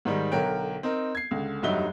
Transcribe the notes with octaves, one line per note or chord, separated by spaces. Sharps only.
G#2 D#3 G3
B1 D3 A#4 C#5 G5
C4 D#4 A#4
G#6 C7
C#2 D3
F1 G2 F#3 D#4 E5 G7